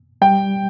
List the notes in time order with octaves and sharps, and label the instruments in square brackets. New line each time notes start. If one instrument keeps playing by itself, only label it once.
[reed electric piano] G3 [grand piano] G5